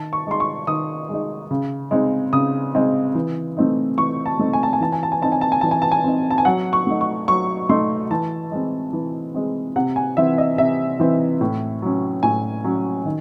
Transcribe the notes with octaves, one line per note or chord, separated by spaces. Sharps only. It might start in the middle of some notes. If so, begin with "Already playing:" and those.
Already playing: D#3 A5
C#6
G#3 D#4 C6
C#6
D#3 D#6
G#3 D#4
C#3
G#3 C4 D#4
C#3 D#6
G#3 C4 D#4
E3
A3 C4 D#4
E3 C#6
A5
A3 C4 D#4
G#5
A5
G#5
E3 A5
G#5
A5
G#5
C4 D#4 A5
G#5
A5
G#5
E3 A5
G#5
A5
G#5
C4 D#4
A5
G#5
F#3 F#5
C#6
A3 D#4
C#6
F#3 C#6
A3 D#4 C6
E3 A5
G#3 C4
E3
G#3 C4
C3 F#5
G#5
E3 C4 E5
D#5
C3 E5
E3 C4
A2
F#3 C#4
A2 G#5
F#3 C#4
D#3